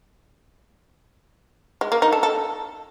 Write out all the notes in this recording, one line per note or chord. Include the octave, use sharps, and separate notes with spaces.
G#3
A#3
D#4
A4
A4